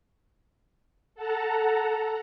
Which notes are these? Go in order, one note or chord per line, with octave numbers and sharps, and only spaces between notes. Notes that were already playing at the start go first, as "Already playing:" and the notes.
A4 F#5 A5 A#5